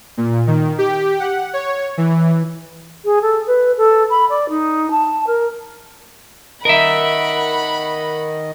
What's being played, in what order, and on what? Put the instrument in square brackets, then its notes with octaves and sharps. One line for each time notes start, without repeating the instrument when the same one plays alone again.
[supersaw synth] A#2
D#3
G4
F#5
C#5
E3
[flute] G#4
A4
B4
A4
B5
D5
D#4
A5
A#4
[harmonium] D#3 D#5 [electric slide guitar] A#4 E5 [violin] F#5 B5